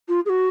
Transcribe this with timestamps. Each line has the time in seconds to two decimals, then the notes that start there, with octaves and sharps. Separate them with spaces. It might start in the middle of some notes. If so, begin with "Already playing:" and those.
0.09 F4
0.26 G#4
0.29 F#4